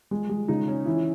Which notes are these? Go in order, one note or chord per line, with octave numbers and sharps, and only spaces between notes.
G#3
G#3
C#3 D#4
C#4
E3 E4